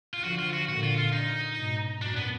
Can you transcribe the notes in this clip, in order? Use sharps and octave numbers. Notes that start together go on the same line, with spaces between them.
F4
D3 F3 F#4
F4
F#4
A#2 D3 F#4
F4
F4
D#4
G#2 B2
F#2 A#2 D4
B3